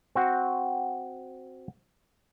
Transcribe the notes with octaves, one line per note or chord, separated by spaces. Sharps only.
C4 F#4